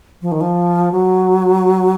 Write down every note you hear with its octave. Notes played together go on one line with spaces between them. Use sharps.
F3
D#3
F3
F#3